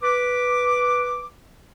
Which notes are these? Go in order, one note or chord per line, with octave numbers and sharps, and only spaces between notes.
B4 D6